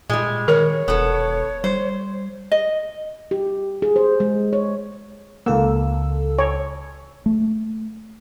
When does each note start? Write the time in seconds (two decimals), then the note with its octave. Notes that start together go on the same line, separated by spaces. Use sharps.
0.10 A#2 G3 G#3
0.48 D#3 A#4 C#5
0.88 E1 B3 A4
1.64 G3 C5
2.52 D#5
3.31 G4
3.82 G#4
3.96 C5
4.20 G#3
4.53 C#5
5.46 C#2 A#3 A4 E6
6.39 C#5
7.26 A3